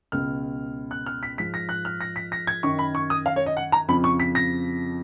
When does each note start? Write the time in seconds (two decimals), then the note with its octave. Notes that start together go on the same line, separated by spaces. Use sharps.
0.12 C#2 B2 F6
0.91 F#6
1.06 F6
1.23 B6
1.38 G#2 F3 B6
1.54 A#6
1.69 F#6
1.85 F6
2.01 A#6
2.16 B6
2.32 A#6
2.47 G#6
2.63 F#2 D#3 C#6
2.79 B5
2.95 C#6
3.10 D#6
3.26 F5
3.36 C#5
3.46 D#5
3.57 F#5
3.72 A#5
3.88 F2 C#3 F3 B5
4.04 C#6
4.20 B6
4.35 A#6